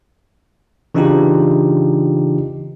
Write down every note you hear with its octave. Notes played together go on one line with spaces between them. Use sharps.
C#3 E3 D4 D#4 F4 G4